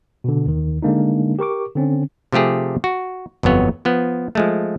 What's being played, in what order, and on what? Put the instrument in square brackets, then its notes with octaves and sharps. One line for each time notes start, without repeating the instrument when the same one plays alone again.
[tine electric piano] B2 D3
D#2 D#3
D3 G#3 A#3 D4 D#4
G4 A#4 C#6 D6
D3 C4 C#4
[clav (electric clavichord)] C3 F3 A3 G4 G#4
F#4
G1 F2 F#3 B3 C#5
F3 B3
F3 G#3 A3